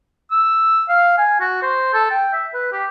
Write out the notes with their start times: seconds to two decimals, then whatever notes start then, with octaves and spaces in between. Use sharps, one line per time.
0.31 E6
0.89 F5
1.18 G#5
1.40 F#4
1.63 C5
1.94 A4
2.11 G5
2.33 E5
2.54 B4
2.72 G4